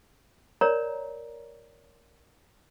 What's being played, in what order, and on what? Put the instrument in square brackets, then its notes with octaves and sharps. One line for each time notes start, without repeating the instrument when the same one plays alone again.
[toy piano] A#4 C#5 D5 A#5